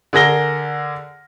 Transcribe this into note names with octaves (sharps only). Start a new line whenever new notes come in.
D3 G#4 A#4 A#6 G7